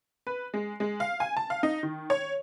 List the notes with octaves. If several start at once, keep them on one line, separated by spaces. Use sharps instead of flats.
B4
G#3
G#3
F5
G#5
A5
F5
D#4
D#3
C#5